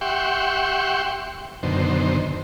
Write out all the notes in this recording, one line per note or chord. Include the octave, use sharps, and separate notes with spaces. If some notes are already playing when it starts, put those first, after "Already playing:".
G4 E5 F#5 G5 C6 C#6
F#2 B2 D3 D#3 C5